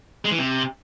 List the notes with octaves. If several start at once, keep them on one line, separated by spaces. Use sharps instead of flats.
G#3
E3
C3